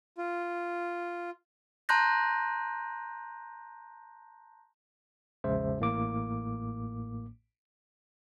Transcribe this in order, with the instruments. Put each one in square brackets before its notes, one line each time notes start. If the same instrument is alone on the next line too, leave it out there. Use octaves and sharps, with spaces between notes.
[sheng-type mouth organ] F4
[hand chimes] A5 A#5 C6 F#6 G6 A#6
[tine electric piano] A#1 E2 C#3 G#3 C5 E5
A1 A2 A#3 D6